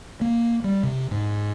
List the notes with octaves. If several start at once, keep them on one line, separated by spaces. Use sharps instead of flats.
A#3
G3
C3
G#2